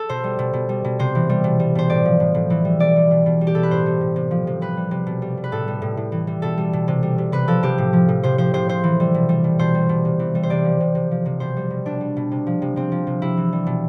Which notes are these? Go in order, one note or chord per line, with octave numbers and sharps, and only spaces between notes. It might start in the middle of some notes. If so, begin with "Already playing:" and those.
Already playing: A4
B2 C5
G3
B2
B2
G3
B2
C3 C5
E3
G3
B2
G3
B2 C5
A2 D5
F3
A2
A2
E3
G3
B2 D5
G3
B2
B2
G3
G4
B2 A4
B4
A2 C5
G3
A2
C3
F3
C3
C3 B4
G3
C3
B2
G3
B2
B4
A2 A4
G3
A2
A2
E3
G3
B2 A4
G3
B2
C3
G3
C3
C3 B4
F3 A4
C3 G4
A2
F3
A2
C3 C5
F3 C5
C3 C5
C3 C5
E3
G3
B2
G3
B2
B2 C5
G3
B2
C3
E3
G3
C5
C3 D5
F3
C3
C3
F3
C3
B2 C5
G3
B2
B2 D4
G3
B2
C3
F3
C3
C3 C4
F3
C3
C3 E4
E3
G3
B2